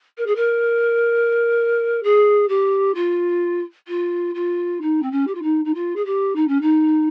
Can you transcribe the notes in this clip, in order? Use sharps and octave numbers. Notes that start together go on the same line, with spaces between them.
A#4
G#4
A#4
G#4
G4
F4
F4
F4
D#4
C4
C#4
G4
F4
D#4
D#4
F4
G#4
G4
D#4
C#4
D#4